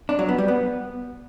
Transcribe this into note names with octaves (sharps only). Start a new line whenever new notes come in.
D4
F#3
B3
G3
B3